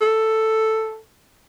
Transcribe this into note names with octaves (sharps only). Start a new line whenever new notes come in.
A4